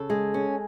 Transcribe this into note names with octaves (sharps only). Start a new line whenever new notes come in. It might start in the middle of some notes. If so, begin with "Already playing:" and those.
Already playing: C#3 A4
G#3
C#4